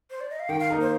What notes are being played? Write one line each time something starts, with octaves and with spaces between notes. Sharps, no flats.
C5
D5
D#5
F5
D#3 G5
F5
A#3 D#4 A#4
C5